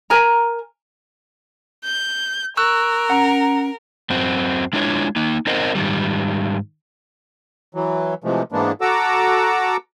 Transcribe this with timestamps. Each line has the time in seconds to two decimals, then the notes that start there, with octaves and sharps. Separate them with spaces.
0.10 A#4 G#5 A#5
1.84 G6
2.57 A#4 C#6 E6 F#6
3.10 C#4 F#5 A#5
4.10 F#2 C4 F#4
4.73 G#3 D4 E4 F4 C#5
5.16 A#3 D#4
5.47 C4 D#4 A#4 C5 D#5 F#5
5.75 G#2 D#3 G3
7.75 E3 F#3
8.24 C3 E3 F3 G#3 A3
8.52 G#2 E3 G#3 A#3 B3 D4
8.81 F#4 A4 F#5 A#5 D6 E6